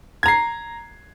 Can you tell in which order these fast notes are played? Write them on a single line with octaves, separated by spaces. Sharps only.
G#6 A#5 C7